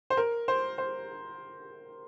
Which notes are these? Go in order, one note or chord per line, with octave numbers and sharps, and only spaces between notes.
C5
A#4
C5
C5